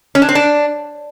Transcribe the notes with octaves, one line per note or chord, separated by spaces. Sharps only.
C#4
D4
C4
D4